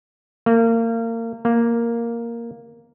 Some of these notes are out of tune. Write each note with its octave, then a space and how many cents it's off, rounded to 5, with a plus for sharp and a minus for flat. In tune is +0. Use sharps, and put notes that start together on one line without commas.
A#3 -30
A#3 +0